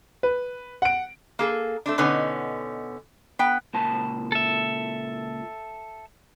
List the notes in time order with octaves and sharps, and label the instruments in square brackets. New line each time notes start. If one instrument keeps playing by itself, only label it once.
[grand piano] B4
F#5 D7
[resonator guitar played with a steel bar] A#3 G#4 A4
A3 C4 D4
B2 D3 B3 C#4 D#4
B3 G5
[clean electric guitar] C#2 A#2 A5
[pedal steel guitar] A4 E5